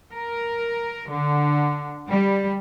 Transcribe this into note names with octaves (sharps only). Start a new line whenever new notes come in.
A#4
D3
G3